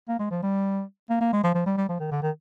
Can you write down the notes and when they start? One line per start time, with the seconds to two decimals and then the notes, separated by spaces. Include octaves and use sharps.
0.08 A#3
0.19 G#3
0.30 F3
0.42 G3
1.09 A#3
1.20 A#3
1.33 G#3
1.43 F3
1.54 F3
1.66 G3
1.77 G3
1.88 F3
2.00 D#3
2.11 D3
2.22 D#3